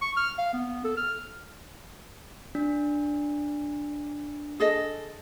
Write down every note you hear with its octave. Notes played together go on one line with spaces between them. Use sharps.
C#6
F6
F5
B3
A4
F6
D4
G#4 A4 D#5